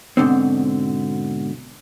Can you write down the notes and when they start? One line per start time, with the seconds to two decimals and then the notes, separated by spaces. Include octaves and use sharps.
0.17 G#2 B2 D3 C4